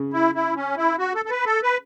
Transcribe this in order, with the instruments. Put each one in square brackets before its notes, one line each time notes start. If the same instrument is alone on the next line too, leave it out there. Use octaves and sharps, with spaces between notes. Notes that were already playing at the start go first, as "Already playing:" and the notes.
Already playing: [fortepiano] C#3
[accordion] E4
E4
C#4
E4
F#4
A4
A4
B4
A4
B4